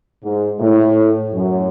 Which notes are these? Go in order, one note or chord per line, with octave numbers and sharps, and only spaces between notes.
G#2
A2
F#2